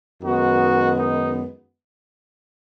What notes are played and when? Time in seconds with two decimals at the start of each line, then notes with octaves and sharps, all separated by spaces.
0.22 F#2 D#3 G#3 B3 D#4 F#4
0.98 D#4